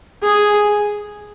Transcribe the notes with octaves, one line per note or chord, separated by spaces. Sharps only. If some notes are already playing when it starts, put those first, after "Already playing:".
G#4